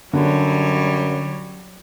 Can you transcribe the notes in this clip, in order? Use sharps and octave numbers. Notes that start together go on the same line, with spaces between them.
F#2 D3 F#3 G3 C#5